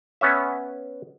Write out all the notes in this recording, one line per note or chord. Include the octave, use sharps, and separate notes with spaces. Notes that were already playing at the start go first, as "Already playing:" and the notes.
B3 C#4 C#5 E5